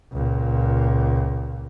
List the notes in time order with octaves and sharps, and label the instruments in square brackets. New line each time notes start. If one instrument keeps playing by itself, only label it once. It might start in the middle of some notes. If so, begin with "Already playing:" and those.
[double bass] C#2 A#2